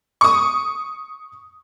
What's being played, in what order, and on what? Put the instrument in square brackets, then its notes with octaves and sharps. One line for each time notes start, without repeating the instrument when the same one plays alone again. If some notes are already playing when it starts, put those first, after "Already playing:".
[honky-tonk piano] C#6 D#6